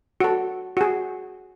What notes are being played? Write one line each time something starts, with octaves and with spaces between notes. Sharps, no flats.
F#4 A4
F#4 G#4